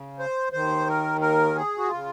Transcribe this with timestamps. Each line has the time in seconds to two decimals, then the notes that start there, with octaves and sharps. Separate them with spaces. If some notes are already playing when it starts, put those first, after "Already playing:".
Already playing: C#3
0.19 C5
0.53 D#2 D#3 C5
0.87 A#4
1.21 A#4
1.55 G#4
1.78 F#4
1.89 F4
1.94 C#3